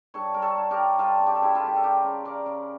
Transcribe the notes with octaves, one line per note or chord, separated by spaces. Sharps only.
G2 A4 C#5
G2 A#4
A4 C#5
G2
G4 A#4
G2
G3 F4 A4
C#3
G4
A4
C#3 E4 G4
F4 A4
G3 G4
A4
C#3 G4 A#4
C#3
C#3 A#4 D5
C#3